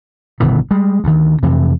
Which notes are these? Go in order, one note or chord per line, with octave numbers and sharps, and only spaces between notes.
G1 B2 D#3 E3
G3 G#3
D2 D#3
F2 C3 E3